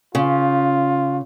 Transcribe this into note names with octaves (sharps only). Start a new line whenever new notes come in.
C#3 F4